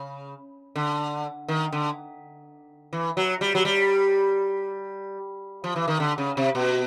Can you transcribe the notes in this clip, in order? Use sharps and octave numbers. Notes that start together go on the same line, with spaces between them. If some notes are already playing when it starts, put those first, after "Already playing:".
Already playing: C#3
D3
D#3
D3
E3
F#3
G3
F#3
G3
F3
E3
D#3
D3
C#3
C3
B2